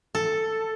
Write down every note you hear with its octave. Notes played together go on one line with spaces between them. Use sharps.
A4